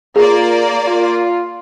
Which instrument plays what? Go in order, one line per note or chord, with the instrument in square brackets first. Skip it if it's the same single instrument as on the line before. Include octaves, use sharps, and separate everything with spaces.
[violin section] A#3 D5 [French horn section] F4 [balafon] G#4
[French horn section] F4